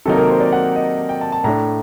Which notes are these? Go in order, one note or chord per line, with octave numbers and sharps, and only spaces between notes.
C3 D#3 F#3 A#3 D#4 A4
A#4
C5
D5
F#5
D#5
G5
A5
A5
A2 A3 D4 A#5